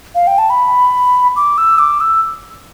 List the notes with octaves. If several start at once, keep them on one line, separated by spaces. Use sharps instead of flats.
F5
G5
A5
B5
D6
E6
D6
E6